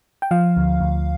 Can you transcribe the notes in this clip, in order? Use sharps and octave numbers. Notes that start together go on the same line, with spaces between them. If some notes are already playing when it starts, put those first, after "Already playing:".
G5
F3 F5
D2
D2